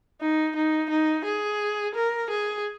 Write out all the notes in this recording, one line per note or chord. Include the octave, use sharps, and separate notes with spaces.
D#4
D#4
D#4
G#4
A#4
G#4